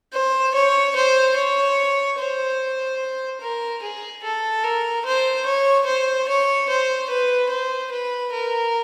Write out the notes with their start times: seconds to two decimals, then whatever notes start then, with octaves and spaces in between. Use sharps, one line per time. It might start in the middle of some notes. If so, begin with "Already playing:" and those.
0.13 C5
0.54 C#5
0.96 C5
1.36 C#5
2.19 C5
3.41 A#4
3.82 G#4
4.24 A4
4.63 A#4
5.05 C5
5.45 C#5
5.86 C5
6.28 C#5
6.69 C5
7.10 B4
7.50 C5
7.92 B4
8.32 A#4